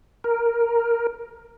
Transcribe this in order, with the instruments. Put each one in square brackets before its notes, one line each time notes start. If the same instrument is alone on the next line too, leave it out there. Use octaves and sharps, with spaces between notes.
[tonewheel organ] A#4